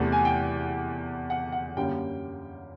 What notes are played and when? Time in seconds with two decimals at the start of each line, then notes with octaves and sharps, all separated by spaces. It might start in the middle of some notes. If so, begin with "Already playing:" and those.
Already playing: E2 C3 E3 A3
0.12 G#5
0.25 G5
1.30 F#5
1.52 F#5
1.77 F#2 D3 G3 A#3 C#4 G5